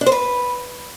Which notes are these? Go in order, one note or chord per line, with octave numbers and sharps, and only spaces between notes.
D4
C5
B4